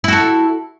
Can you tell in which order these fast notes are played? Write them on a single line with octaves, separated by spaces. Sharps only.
E4 F#4 A4